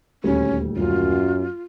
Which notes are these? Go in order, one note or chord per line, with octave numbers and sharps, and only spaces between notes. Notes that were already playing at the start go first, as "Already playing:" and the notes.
D#1 D2 G3 C#4
F#2 F4